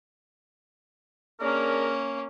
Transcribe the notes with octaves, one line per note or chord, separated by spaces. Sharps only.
A#3 C#4 D4 G#4 A#4